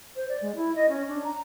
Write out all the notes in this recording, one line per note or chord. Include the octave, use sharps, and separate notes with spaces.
C5
D5
G#3
E4
D#5
C#4
D4
A#5